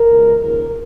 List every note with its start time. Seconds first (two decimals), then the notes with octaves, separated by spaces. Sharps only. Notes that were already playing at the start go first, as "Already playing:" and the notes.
Already playing: A#4
0.11 C#2 B2 G#3
0.39 D#2 C#3 F3 A#3 A#4